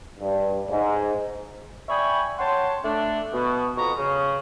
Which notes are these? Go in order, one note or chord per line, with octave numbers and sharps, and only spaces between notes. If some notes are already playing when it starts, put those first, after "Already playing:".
G2
G#2
D5 E5 G5 G#5 B5 C#6
C#5 F#5 G5 A5 C6
A3 D4
B2
F2 B2 G#3 B3 A#5 C#6
C#3